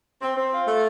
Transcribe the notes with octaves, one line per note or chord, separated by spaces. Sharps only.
C4
C4
F4
A3